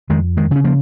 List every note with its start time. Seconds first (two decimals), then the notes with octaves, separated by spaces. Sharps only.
0.10 F2 D#3 G#3
0.37 D#3 G#3
0.51 C#3 C#4
0.64 F3 A#3